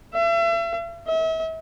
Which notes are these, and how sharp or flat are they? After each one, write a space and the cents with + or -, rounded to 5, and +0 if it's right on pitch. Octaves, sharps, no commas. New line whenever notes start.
E5 +40
E5 -40